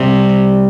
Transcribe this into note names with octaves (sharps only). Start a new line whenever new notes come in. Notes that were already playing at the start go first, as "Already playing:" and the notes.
Already playing: C3 G3